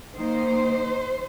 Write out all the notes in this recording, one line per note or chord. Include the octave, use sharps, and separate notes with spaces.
D#3 A#3 D#4 C5